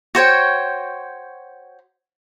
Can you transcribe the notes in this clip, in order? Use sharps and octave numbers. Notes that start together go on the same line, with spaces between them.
F#4 C5 C#5 G5